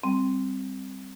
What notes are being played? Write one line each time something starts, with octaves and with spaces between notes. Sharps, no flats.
G3 C4